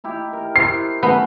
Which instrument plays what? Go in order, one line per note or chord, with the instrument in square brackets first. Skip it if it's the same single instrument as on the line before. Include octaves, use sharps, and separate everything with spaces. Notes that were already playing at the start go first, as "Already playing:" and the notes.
[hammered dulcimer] D#4 E4 G4
A#4
[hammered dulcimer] E4 C5 [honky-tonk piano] C7
[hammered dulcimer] F#3 A3 C#4 [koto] B3